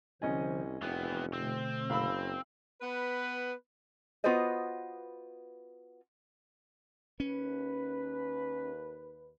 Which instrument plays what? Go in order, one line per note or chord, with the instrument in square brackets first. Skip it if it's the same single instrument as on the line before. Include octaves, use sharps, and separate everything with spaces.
[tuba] C2 [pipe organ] D3 F3 C5 [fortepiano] C#4 D#5 G#5
[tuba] F1 [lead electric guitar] E2 B3 [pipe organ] G5
[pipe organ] B2 D3 A3 [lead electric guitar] C4
[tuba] F#1 [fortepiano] F5 B5 E6
[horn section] B3 B4
[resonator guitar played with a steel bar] B3 F4 F#4 B4 C5 D#5
[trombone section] D#2 B4 [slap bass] C#4